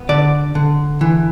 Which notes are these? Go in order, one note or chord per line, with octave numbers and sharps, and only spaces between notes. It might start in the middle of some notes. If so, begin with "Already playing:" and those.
Already playing: B3
D3 D5
D3
E3